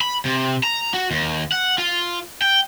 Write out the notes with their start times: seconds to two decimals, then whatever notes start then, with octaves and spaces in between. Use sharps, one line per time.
0.01 B5
0.25 C3
0.63 A#5
0.94 F#4
1.11 D#2
1.52 F#5
1.78 F4
2.42 G5